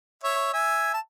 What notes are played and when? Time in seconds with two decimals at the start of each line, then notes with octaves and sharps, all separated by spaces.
0.23 C#5 E5
0.53 E5 G#5
0.94 A5